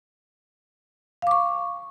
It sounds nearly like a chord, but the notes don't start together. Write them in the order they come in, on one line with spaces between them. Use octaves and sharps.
F5 D6 C#6